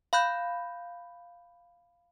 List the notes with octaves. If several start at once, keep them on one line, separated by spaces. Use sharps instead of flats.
F5 B5 F#6 G6